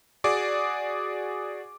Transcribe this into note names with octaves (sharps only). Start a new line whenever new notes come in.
F#4 G#4 D5 D6